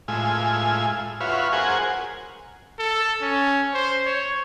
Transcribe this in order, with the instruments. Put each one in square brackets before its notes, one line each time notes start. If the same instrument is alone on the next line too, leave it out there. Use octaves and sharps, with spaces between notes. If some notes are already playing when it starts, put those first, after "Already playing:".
[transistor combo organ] A2 G#3 F4 G#5 E6
F4 F#4 B4 C#5 E5 F5
F#4 G#4 A#4 C5 F#5 G#5
[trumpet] A4
C#4
C5
C#5